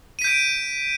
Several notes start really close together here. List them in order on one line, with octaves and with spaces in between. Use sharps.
D#7 B6 G6 D7